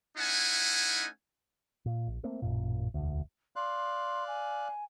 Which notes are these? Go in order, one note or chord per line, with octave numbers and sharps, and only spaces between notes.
A3 C#4 D#4 E4 F#5 G#5
A#2
A#1
A3 A#3 C4
A1 F#2 A#2
E1 D2
D5 F5 C6 F#6
G#5